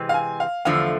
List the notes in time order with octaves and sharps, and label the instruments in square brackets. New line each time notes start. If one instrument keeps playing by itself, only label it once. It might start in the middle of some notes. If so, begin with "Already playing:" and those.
Already playing: [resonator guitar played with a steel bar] C3 E3 G#3 C4
[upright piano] F5
G#5
F5
[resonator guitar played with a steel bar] E2 D3 F3 A3 [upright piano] F5